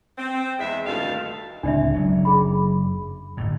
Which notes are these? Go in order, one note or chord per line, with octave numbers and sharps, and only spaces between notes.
C4
E2 G#3 E5
D2 G2 A#2 D#3 A4 F5
D1 C#2 C4 D4 D5 E5
F#1 F#2 F#3
G#4 B5
G1 A2